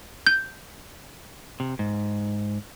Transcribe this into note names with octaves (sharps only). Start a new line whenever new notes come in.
G6
C3
G#2